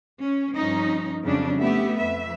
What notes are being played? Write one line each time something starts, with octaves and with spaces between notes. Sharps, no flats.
C#4
G2 F3 C#4 D#4
F2 C#3 F#3 G3 C#4 D4
A3 B3 G4 E5
F2 B4 E5